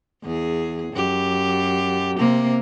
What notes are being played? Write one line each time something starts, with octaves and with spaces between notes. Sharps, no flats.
E2 G#4
F#2 G4
C3 A#3 C4